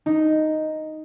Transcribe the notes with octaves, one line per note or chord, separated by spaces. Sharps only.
D#4